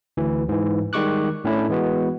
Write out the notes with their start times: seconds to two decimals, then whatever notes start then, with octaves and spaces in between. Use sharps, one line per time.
0.17 D2 E3
0.49 G#2 E3
0.93 D#3 G3 G#3 C#6 D6 F#6
1.44 A2 C#4 D4 E4 A4
1.69 E3 G#3 B3 F#4